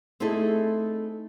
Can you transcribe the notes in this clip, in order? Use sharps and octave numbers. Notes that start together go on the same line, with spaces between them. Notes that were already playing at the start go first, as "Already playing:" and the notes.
A3 C4 D#4 E4 G#4 A4